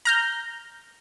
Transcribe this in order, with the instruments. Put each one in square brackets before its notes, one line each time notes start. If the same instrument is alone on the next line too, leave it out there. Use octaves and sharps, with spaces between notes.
[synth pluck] A#5 F6 G6